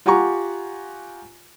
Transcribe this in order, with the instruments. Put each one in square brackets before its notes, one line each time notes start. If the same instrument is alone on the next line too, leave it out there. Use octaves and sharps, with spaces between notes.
[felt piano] F4 G4 F#5 G#5 A#5 C#6